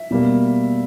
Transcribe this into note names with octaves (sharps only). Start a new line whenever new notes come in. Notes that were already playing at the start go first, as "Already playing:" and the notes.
Already playing: E5
B2 G3 A#3